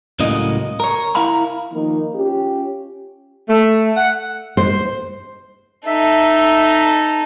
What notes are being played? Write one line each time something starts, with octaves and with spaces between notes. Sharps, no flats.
C#2 A2 C#3 F#3 A#3 D#5
A#4 C#5
E4 A#4 F5 A#5 B5
D#3 F3 A#3 D#4
C#4 F4 G4
A3
F#5
C5
D#4 A4 E5